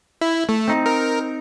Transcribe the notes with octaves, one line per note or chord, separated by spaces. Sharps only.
E4
A3
C4 D#4
A#4